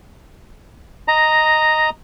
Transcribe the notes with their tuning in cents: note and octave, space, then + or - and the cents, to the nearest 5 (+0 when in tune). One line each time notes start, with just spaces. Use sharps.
D#5 +0 A#5 -5